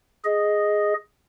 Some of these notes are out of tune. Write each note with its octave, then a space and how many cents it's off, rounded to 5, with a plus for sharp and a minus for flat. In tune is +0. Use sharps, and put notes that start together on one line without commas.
G#4 +0 D#5 +0